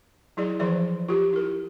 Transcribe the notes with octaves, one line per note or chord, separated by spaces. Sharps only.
F#3 E4 G#4 D5
E3 F3 G#4 D5 E5
F4 G4
E4 A#4